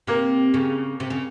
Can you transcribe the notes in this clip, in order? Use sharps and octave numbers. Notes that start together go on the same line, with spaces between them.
C3 A#3
C#3
C3
C#3